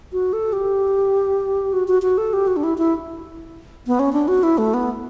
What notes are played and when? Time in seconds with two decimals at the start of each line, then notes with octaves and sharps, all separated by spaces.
0.13 F#4
0.33 A4
0.53 G4
1.73 F#4
1.88 F#4
2.02 F#4
2.18 A4
2.33 G4
2.47 F#4
2.57 D4
2.64 E4
2.78 E4
3.87 B3
3.99 C#4
4.13 D4
4.28 F#4
4.43 E4
4.58 A3
4.74 B3